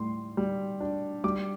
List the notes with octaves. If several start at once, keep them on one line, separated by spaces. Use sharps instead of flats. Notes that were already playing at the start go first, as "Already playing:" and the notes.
Already playing: A2 G3 C6
G3
D4
G3 D6